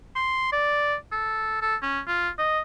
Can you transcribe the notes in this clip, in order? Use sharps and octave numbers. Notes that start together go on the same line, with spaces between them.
C6
D5
A4
A4
C#4
F4
D#5